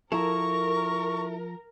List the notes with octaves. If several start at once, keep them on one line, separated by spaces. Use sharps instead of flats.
F3 E4 A4 A#4 A#5 C#6